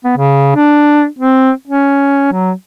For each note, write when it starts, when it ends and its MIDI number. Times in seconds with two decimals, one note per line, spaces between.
0.04 0.14 59
0.17 0.52 49
0.56 1.06 62
1.19 1.51 60
1.67 2.28 61
2.32 2.52 54